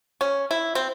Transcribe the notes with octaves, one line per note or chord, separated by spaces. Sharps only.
C#4
E4
C4